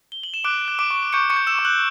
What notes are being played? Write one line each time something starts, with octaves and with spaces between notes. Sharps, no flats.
G7
F#7
E7
D6 F#6 D7
F#6
D6 D7
C#6
C#6 G6 C#7
C#6 C#7
G6
E6 E7
C#6
F#6 F#7